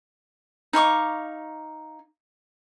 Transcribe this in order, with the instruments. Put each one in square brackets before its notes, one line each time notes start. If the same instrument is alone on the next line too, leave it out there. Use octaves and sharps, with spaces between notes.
[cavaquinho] D#4 F5 C#6 D6